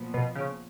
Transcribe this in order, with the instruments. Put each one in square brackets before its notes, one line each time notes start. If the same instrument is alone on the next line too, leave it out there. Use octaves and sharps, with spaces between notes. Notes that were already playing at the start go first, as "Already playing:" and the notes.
Already playing: [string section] A#2 F3 B3
[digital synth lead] B2
C#3